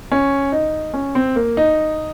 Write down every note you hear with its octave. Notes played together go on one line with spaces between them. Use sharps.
C#4
D#4
C#4
C4
A#3
D#4